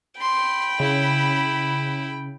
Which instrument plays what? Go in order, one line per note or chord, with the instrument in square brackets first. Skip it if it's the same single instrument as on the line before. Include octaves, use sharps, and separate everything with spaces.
[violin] G5 B5 [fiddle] C6
[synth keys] C#3 [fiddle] E4